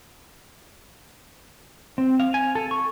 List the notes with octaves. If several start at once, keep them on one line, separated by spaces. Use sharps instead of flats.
C4
F5
G#5
A4
C#6